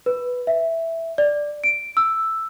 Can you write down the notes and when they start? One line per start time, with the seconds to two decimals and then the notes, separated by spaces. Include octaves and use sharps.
0.06 B4
0.47 E5
1.18 D5
1.64 D7
1.97 E6